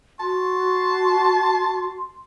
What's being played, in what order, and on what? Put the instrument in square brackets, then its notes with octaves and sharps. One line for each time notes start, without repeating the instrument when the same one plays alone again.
[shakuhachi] F#4 [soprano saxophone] A5 [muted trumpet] C6